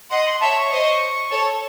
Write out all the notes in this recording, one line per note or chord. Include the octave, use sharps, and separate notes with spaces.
D#5 F#5 C6
C6
C#5 E5 A5
C#6
C5 D#5
A4 C#5